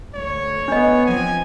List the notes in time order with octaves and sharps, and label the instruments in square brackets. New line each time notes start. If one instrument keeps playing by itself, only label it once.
[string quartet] D2 [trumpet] C#5
[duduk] B3 [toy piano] D4 D#5
[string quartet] F3 C4 [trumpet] G#5